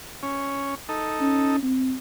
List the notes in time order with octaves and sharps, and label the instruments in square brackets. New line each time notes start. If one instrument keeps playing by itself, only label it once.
[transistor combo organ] C#4
D#4 A4
[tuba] C#4
C4